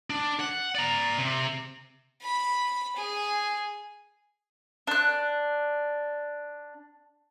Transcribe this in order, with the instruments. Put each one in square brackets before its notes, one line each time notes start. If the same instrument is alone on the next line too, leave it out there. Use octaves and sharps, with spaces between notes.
[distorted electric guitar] D4
F#5
D5 A#5
C3
[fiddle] B5
G#4
[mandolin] D4 F#6